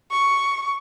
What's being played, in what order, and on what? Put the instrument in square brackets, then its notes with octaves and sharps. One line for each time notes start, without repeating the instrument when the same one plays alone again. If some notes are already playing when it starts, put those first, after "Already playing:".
[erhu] C#6